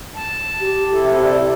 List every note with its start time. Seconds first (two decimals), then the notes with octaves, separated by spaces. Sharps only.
0.16 A5
0.61 G4
0.92 C3 E4 A4
1.24 D5